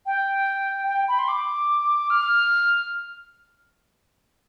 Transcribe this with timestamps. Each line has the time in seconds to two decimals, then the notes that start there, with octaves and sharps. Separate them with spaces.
0.06 G5
0.87 G5
1.08 B5
1.19 C6
1.28 D6
2.10 F6